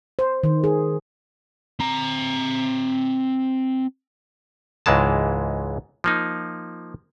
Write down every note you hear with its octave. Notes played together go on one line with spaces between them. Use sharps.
C5
D#3
G#4
C4 A#5
C#2 G#2 E3 G#3 A5
F3 A#3 D#4